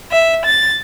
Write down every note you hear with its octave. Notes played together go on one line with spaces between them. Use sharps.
E5
A6